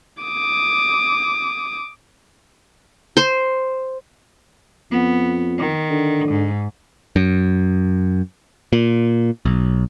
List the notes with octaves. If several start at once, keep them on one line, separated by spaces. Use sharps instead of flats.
D6 D#6
C5
F2 B3
D#3
D3
G#2
F#2
A#2
B1